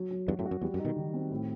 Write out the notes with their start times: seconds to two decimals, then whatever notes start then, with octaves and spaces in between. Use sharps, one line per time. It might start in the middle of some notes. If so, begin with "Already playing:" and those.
Already playing: F#3
0.10 F#3
0.28 E2 G2 F#4
0.39 F#2 A2
0.46 F#4
0.51 F#2
0.62 E2 G3
0.74 F#2
0.79 D#4
0.85 B2 D#3
0.96 D#3
1.14 C4
1.31 A2